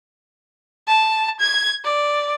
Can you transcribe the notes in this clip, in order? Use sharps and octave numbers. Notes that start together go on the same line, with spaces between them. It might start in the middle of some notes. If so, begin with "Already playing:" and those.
A5
G#6
D5